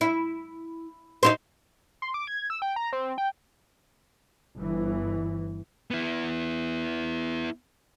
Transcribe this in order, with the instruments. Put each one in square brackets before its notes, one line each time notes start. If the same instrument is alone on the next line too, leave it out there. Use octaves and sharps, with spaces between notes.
[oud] E4
D#4 E4 C5
[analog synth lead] C6
D6
G#6
E6
G5
A#5
C4
G5
[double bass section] G1 E3
[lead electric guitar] B3 E4